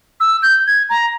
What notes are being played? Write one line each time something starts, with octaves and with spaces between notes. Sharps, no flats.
E6
G6
G#6
A#5